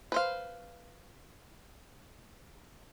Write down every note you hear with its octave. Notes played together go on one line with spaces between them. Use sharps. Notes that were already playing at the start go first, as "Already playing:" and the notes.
B4 C5 F5